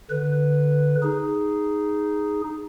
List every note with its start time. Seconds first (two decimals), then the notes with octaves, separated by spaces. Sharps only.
0.10 D3 B4
1.03 D#4 G#4